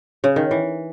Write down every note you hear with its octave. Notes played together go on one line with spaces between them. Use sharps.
C#3
D#3
E3